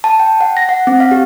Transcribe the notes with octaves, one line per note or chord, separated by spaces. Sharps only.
A5
G5
F#5
A#6
F#5
C4
F5
G4